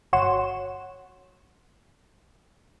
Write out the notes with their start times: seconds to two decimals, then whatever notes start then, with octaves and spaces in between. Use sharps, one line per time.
0.13 G1 F#4 C#5 F#5 C6 E7